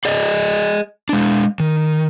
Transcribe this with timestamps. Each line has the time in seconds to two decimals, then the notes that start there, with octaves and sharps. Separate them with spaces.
0.05 G#4 D5 D#5
1.09 G#3 D4
1.60 D#3